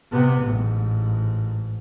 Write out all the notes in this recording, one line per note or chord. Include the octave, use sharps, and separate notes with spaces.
C3 B3
A1 G#2